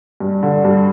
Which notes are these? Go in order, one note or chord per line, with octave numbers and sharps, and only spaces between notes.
G2
D3
G2